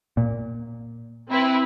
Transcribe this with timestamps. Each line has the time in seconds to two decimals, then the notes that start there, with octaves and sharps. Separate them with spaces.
0.17 A#2
1.30 C4 E4 B4